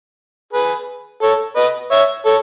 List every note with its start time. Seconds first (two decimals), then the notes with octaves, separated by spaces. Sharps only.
0.53 G#4 B4
1.23 A4 C#5
1.56 B4 D#5
1.91 C#5 E5
2.25 A4 C#5